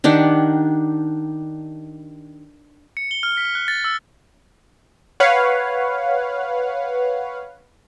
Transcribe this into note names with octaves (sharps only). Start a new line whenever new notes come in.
D#3 D4 G4 F#5
C#7
G7
F6
B6
F#6
A6
E6
B4 C#5 F5 F#5